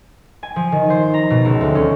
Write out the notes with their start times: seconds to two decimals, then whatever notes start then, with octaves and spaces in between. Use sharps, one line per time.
0.43 G#5
0.56 F3
0.72 D#3
0.90 C5
1.14 A#5
1.30 B2
1.45 C#2
1.61 D2
1.75 C#4